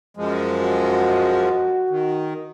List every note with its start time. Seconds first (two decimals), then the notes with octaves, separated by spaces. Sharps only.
0.17 F#2 F3 G#3
0.62 F#4
1.90 D#3